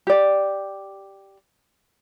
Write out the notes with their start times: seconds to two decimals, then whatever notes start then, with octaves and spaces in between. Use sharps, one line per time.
0.07 G4 D5